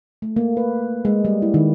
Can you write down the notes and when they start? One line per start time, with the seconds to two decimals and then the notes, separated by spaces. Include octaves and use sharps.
0.22 A3
0.36 A#3
0.57 B4
1.05 G#3
1.25 G3
1.42 E4
1.54 D#3